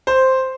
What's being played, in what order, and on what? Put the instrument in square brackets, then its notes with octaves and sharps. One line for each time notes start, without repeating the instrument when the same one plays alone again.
[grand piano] C5